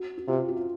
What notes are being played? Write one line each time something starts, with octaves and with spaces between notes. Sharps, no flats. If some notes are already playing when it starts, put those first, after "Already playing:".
Already playing: F#4
F#4
C3 F4
F#4
F4